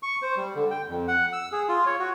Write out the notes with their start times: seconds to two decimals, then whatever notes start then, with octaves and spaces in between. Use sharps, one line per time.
0.03 C#6
0.22 C5
0.37 G3
0.55 D3
0.71 G5
0.88 F2
1.08 F#5
1.33 E6
1.52 G#4
1.69 F4
1.86 C#5
1.99 F#4